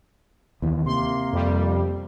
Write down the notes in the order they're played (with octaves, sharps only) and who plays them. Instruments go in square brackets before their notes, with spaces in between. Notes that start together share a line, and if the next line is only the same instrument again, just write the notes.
[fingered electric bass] D#2 E3
[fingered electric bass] C3 [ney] A#3 [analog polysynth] C6
[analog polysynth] F2 G3